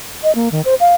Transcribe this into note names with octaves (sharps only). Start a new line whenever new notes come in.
D#5
A#3
D#3
C5
F5